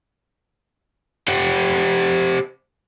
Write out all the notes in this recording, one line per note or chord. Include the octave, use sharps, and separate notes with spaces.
G4 C5 E5 F#5 G5